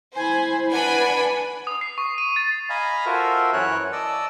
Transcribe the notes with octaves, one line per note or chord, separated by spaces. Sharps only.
E4 C5 G#5 B5
D4 B4 F#5 G#5 B5
D#6
C7
C#6
D#7
A6
D#5 F5 G#5 A#5 B5
F4 F#4 A4 A#4 C5 E5
F#2 E3 C#4 C#5 F#6
D5 D#5 A5 E6